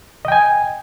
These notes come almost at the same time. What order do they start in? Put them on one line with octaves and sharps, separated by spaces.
D#5 G5 G#5